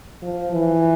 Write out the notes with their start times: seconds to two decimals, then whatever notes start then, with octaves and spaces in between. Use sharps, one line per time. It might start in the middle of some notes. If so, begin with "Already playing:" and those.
0.22 F3
0.52 E3